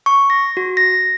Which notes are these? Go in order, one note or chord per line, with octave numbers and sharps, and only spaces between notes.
C#6
A#6
F#4
A#6